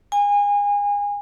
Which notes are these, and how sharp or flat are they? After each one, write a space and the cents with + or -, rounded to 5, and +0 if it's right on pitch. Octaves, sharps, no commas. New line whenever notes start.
G#5 -30